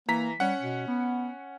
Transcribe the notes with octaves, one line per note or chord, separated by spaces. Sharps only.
E3 A#3 A#5 B6
G3 C#4 F#5
B2
B3